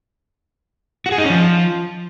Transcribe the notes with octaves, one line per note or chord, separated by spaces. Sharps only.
F#4
G#4
D#4
C#4
F3